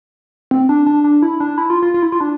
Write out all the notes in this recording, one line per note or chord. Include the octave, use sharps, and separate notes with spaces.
C4
D4
D4
D4
E4
D4
E4
F4
F4
F4
E4
F4
D4